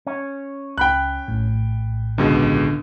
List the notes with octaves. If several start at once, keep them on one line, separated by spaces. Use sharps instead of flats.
C#4
C#2 G5 B5 F#6
A#1 A2
C#2 B2 D3 G#3